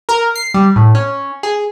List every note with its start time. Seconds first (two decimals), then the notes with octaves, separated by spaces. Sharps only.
0.09 A#4
0.35 C7
0.54 G3
0.76 A2
0.95 C#4
1.43 G#4